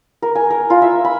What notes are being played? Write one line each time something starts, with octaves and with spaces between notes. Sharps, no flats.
A#4
G#5
A#4
F4
E5
B5